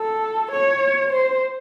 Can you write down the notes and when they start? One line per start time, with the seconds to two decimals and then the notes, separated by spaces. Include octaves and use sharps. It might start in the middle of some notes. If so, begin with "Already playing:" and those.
Already playing: A4
0.52 C#5
1.11 C5